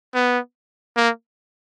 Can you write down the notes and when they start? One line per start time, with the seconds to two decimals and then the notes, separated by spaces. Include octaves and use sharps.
0.14 B3
0.97 A#3